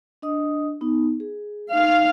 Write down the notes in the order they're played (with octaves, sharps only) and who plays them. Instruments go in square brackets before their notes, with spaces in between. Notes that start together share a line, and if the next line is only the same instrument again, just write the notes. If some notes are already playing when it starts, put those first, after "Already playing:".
[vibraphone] D4 D#5 D#6
B3 D#4
G#4
[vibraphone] D#4 [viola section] F5